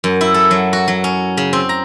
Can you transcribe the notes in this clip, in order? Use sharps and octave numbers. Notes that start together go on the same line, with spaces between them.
F#2
E4
A4
F#3
F#4
F#3
C#4
C#3
C4
A#5